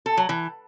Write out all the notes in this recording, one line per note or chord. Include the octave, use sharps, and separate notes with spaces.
A4
F#3
E3